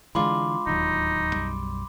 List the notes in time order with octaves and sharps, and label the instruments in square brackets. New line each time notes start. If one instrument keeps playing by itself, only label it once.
[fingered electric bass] D3 E3 [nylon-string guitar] G#3 D4 F4 [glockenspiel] B5 C6 D6
[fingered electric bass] D1 D#2 F#3 [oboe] D#4
[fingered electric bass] B1 F#2 G3